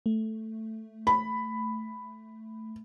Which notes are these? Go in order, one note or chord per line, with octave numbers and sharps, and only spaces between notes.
A3
B5